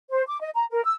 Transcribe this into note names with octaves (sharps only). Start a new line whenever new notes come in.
C5
D6
D#5
A#5
A#4
E6